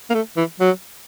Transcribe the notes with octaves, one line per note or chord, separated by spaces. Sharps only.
A#3
A3
E3
F#3